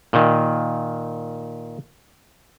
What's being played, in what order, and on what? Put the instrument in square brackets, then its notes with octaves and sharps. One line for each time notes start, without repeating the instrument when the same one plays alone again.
[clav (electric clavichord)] A#2 D#3